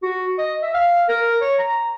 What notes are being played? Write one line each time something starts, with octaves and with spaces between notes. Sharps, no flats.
F#4
D#5
E5
F5
A#4
C#5
A#5